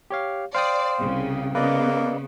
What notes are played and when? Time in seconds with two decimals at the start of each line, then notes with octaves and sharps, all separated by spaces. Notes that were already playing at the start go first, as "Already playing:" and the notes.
0.10 G4 C#5 F5
0.54 C5 D5 F5 G5 D#6
0.98 C2 C#3
1.55 C#3 A#3 B3 B4 D5 D#5